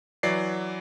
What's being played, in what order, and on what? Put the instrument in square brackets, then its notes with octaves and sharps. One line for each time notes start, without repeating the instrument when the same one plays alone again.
[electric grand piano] E3 F#3 D5 C7